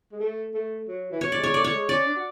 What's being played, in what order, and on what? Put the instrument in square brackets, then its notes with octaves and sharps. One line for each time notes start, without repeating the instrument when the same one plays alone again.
[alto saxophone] G#3
A3
A3
F#3
E3
[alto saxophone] F#3 [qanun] C#5
[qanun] D5
[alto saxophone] G#3
[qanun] C#5
[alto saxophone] A3 [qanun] D5
[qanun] C#5
[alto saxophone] G#3
[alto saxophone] C#4 [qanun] D5
[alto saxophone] D4
F#4